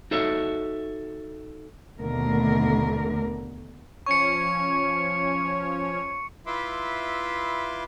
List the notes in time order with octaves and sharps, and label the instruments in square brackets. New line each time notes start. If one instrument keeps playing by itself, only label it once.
[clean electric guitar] D#4 F#4 A4 C#5 E5
[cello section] D#2 B2 D3 A3 A#4
[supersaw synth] F3 C#4 C#5 [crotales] C#6 C#7
[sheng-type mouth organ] E4 F4 B4 E5 C6 D6